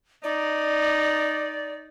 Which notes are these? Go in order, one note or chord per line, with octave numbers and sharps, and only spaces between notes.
D#4 D5